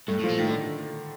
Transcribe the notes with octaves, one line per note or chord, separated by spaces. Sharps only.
G2 A3
A2 F3
A#2
A2 D#3
D3